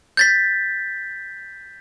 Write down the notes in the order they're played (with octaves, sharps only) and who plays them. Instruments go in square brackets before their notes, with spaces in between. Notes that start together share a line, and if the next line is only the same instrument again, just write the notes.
[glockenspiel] G6 A6 B6